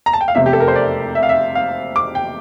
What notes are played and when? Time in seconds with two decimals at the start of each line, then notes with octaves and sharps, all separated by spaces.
0.06 A#5
0.13 A5
0.21 G5
0.28 F5
0.35 F1 E2 C3 E5
0.46 G4
0.53 A4
0.60 A#4
0.68 C5
0.76 D5
1.15 E5
1.23 F5
1.29 E5
1.55 F5
1.96 D6
2.15 G5